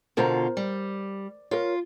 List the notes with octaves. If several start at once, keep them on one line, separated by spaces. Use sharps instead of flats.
B2 D3 F4 A#4 C5 A#5
G3
F4 A#4 C#5